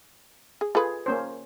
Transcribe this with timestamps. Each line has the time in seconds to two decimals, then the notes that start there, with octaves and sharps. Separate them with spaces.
0.61 G#4
0.75 F4 G#4 A4 B4
1.06 A#3 C#4 C5